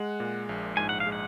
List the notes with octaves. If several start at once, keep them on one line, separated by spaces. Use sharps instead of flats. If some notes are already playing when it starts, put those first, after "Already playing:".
Already playing: G#3 F#5
A#2
A#1
G#2 G#5
F#5
F5
G#3
F#5